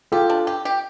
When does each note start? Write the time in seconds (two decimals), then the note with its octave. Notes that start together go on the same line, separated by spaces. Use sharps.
0.12 F4 G4 A4
0.30 D4
0.47 G4
0.65 G4